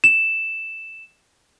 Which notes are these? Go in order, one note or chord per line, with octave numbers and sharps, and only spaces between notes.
E7